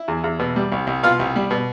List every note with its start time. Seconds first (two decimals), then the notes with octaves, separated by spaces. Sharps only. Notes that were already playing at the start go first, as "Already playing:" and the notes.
Already playing: E4
0.08 E2
0.24 E2
0.39 B2
0.56 G3
0.72 C2
0.87 C2
1.03 B2 F4 F5
1.19 C2
1.36 G3
1.51 B2